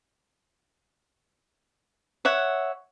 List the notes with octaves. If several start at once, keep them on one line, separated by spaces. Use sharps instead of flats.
C#5 E5 F#5